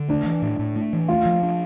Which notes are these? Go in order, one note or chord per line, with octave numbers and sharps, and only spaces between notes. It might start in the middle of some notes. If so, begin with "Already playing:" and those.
Already playing: D3
A3 D4
E3
A2
A2
A3
E3
A3 F4
F3
D4